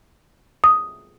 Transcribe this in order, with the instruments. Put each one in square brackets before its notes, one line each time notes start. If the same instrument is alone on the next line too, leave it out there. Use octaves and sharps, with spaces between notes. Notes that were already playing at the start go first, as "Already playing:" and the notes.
[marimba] D#6